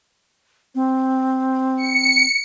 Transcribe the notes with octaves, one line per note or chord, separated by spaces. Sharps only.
C4
C#7